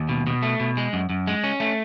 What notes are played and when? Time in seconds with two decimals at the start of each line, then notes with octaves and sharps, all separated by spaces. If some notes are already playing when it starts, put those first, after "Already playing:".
Already playing: D#2
0.09 B2
0.27 B2
0.43 A3
0.60 B2
0.77 G#3
0.93 F#2
1.09 F#2
1.27 G#3
1.44 C#4
1.60 A3